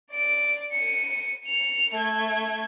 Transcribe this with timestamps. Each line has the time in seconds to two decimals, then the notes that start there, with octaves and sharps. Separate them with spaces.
0.11 D5 D7
0.72 C#7 D#7
1.45 C#7 F7
1.95 A3 G#6